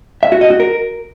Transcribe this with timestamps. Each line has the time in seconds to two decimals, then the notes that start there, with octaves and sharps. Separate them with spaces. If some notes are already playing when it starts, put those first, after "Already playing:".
0.23 E5
0.32 F#4
0.41 D#5
0.50 F#4
0.60 A#4